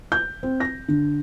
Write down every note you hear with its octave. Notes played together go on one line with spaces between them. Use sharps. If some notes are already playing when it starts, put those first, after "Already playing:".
G6
C4
A#6
D3